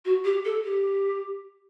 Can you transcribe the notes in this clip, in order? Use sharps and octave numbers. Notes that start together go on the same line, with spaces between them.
F#4
G4
A4
G4